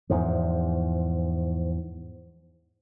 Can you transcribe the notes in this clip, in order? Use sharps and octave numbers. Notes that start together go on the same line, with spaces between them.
E2 G#2 F3